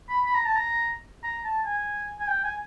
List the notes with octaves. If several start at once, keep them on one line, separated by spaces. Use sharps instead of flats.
B5
B5
A#5
A5
A#5
A#5
A5
G#5
G#5
G5
G#5